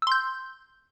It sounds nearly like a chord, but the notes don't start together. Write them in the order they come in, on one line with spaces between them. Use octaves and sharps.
E6 C6 G6